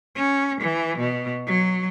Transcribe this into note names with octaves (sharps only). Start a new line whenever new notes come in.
C#4
E3
B2
F#3